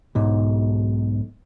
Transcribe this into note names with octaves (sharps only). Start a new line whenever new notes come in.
B1 G#2